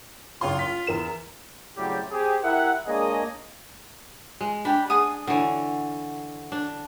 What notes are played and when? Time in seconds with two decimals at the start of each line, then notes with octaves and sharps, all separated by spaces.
0.41 F#1 F4 C#5 C6
0.59 B6
0.87 E2 A#4 E7
1.77 A2 C#3 F#3 G3 C4 G4
2.11 C4 G4 G#4
2.43 E4 G4 A#4 E5 F#5
2.87 G#3 A#3 D4 G#4 C#5 D#5
4.41 G#3
4.65 D4 G4 G5 B5
4.90 G#4 F#5 D#6
5.27 D3 E3 F#4 C#5
6.52 D4